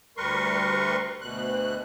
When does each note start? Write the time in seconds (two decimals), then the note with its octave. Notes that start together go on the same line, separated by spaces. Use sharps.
0.17 D2 G3 A#4 B4 C6 C#6
1.21 D2 B2 F#6